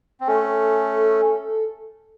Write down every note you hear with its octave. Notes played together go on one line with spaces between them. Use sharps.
C4
A3 C#4 A4